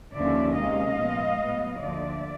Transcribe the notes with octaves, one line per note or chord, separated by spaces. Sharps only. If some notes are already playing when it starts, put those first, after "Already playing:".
D#2 D3 F3 A#3 C#4 D5 E5
C3 D#3 G#3 C#4 D#5 F5
A#2 F3 G#3 B3
A2 F#3 B3
D2 D3 F3 A#3 D5 E5